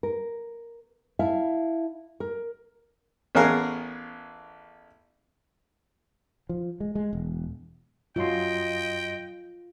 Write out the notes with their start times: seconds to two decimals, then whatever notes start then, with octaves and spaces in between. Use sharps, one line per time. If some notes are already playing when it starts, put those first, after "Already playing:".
0.03 A#4
1.19 E4 E5 F5 A5
2.20 A#4
3.35 A1 B3 C#4 G#4 A#4 F5
6.49 F3
6.80 G#3
6.95 G#3
7.13 E1
8.16 F#2 F#3 F4 D#5 G5 C6